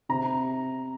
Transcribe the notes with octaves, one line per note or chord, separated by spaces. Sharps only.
C3 A#5